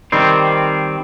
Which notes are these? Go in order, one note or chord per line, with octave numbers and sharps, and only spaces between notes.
D#3 G3 C4